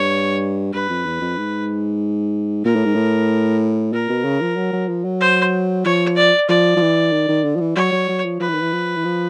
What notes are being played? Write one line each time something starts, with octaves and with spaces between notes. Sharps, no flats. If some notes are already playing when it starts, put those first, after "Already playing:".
Already playing: G2 C#5
G2 B4
F2
E2
F2
G#2
A#2 A#4
A2
G#2
A2
A#2 A#4
B2
C#3
F3
F#3
F#3
F3
F#3
C5
F3 C#5
D5
F3 D5
F3
E3
D#3
D#3
D3
F3
E3
F#3 C#5
F#3
F#3
F3
F3 B4
E3
D#3
E3
F3
E3
F3